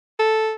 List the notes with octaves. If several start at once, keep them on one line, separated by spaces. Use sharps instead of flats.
A4